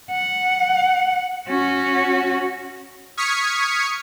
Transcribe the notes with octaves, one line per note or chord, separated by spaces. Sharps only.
F#5
C#4 F#4
C#6 D#6 F6 G#6 B6 C#7